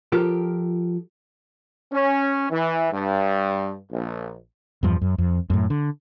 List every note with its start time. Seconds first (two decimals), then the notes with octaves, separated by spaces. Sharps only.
0.12 F3 F4 G4 A4 A#4
1.92 C#4
2.50 E3
2.92 G2
3.92 A#1
4.83 E2 G2 F3
5.01 F#2
5.18 F2
5.50 F#2 A2
5.70 D3